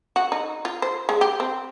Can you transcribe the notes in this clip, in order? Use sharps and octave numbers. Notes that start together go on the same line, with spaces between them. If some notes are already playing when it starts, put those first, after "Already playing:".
F#4
D#4
F4
C5
G#3
G4
C4